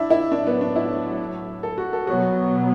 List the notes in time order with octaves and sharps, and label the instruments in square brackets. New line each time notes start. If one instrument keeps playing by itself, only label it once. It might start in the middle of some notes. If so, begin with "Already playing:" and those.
Already playing: [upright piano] D4 E4
E4
[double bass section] A2 F#3 A3 [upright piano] D4
[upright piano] B3
D4
E4
A4
F#4
A4
[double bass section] B2 F#3 B3 [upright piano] F#4